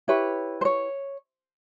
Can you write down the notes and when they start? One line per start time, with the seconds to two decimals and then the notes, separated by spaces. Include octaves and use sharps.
0.08 E4 G4 B4 C#5
0.61 C5
0.65 C#5